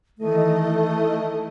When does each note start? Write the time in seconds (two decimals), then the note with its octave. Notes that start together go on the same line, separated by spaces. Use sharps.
0.18 D#3 E3 A3 D#5